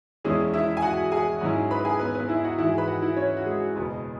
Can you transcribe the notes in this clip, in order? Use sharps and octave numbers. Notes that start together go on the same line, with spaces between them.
E1 E2 E3 G#3 C#4 E4 G#4
E4 E5
G#5
F#4 F#5
G#4 G#5
G#2 F#3 C#4 E4
B4 B5
G#4 G#5
B3 B4
B3 B4
E4 E5
F#4 F#5
G#2 E3 G#3 E4 E5
G#4 G#5
B4 B5
F#4 F#5
E4 E5
C#4 C#5
F#4
G#3 G#4
F#1 E2 B2 B3